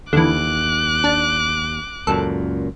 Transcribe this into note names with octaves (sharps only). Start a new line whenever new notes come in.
D#2 D3 E3 D6 F#6
D4
C#2 F#2 A#2 A4